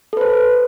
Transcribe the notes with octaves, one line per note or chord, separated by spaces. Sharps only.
A4 B4 C5